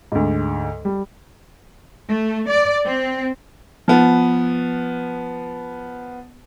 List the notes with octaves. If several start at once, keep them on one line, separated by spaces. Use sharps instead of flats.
D2 G#2
G3
A3
D5
C4
F3 B3